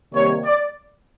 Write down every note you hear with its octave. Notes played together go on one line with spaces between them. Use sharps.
C3 D#3 G3 A#3 C#5
D5